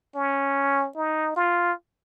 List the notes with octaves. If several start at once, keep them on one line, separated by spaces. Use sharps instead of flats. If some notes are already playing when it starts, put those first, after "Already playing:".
C#4
D#4
F4